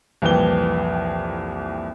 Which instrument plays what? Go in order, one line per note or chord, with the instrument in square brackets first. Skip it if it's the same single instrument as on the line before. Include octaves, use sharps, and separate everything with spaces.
[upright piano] C2 F2 A#2 E3 G4 G7